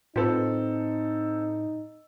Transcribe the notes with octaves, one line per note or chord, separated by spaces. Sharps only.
A2 C4 D#4 F4 A4 B4 C5